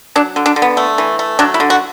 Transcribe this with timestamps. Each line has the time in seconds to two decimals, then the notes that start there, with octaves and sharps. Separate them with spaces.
0.15 F#3 D4
0.36 D3
0.46 D4
0.56 D3
0.62 B3
0.77 A3
0.98 E3
1.19 A3
1.39 F#3 D4
1.54 E4
1.60 D3
1.70 F#4